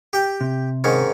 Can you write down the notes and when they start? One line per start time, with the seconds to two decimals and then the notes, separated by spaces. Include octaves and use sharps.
0.13 G4 G5
0.41 C3
0.84 G#2 D#3 C#4